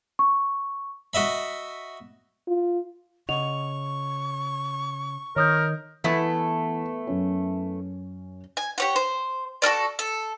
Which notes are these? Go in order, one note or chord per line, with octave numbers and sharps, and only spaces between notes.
C#6
F#4 D#5 E5 B5
F4
C#3 D#5 F#5 C#6 F7
D#3 A#4 C#5 D#6 G6
E3 A3 B3 E4
F#2 C#4
G#5
G4 C#5 F#5
C5
F#4 A4 A#4 D5
A4